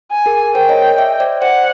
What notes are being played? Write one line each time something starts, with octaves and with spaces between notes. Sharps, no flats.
G#5
G#4 A#4
A#4 C5 G5
C#5 D#5
D5 E5
C5 D5
C5 D5 F#5